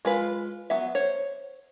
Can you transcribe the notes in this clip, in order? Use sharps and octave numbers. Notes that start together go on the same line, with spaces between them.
G#3 F4 B4
F#3 B3 E5
C5 C#5